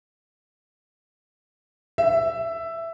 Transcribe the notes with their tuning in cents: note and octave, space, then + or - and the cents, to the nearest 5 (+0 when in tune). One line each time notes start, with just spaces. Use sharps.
E5 +10